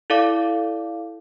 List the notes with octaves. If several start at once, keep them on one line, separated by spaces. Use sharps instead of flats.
E4 A4 D5 F5 D6